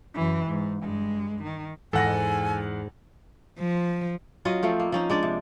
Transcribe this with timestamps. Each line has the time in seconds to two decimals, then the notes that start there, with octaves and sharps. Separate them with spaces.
0.15 F#2 E3
0.47 G#2
0.83 G2 G#3
1.43 D#3
1.93 E2 G#2 A4 F#5 G#5 A#6
3.59 F3
4.45 F#3 C#4 F4 D#5
4.63 F3 A3 C4
4.79 A#3
4.92 F3 C#4 D#4
5.10 G#3 D4 D5
5.23 C3